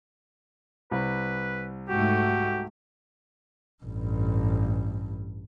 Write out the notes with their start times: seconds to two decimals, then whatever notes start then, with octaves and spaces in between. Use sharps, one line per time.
0.91 C2 B4
1.89 G#2 A3 F#4 G4
3.84 A1 G2